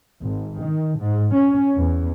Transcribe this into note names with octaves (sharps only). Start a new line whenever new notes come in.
G#1
D#3
G#2
C#4
E2